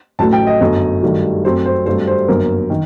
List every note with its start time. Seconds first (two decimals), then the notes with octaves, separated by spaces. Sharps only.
0.19 A1 A2 F#3 A3 A5
0.33 G5
0.47 D#5
0.60 G1 F#2 F#3 A3
1.03 G2 D#3 F#3 A3
1.44 F#2 F#3 A3 C4 C5
1.65 C5
1.86 G2 F#3 A3 C4 C5
2.07 C5
2.28 G1 F#2 F#3 A#3 A#4
2.70 D#3